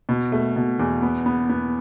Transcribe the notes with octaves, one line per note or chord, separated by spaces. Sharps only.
B2
A3
B2
E2
B3
B3
B3